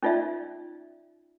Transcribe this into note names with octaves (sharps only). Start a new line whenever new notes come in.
C#4 D#4 F4 D5 E5